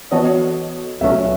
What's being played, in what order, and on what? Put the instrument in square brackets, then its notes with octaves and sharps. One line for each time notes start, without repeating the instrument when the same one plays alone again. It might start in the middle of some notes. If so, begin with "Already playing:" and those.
[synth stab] E3 B3 F#4 A4 D#5 [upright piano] C#5
[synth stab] C#2 B2 F#3 A3 C#4 [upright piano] E5